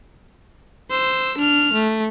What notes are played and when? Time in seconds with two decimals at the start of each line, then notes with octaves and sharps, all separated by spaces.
0.90 C5 E6
1.38 D4 F6
1.73 A3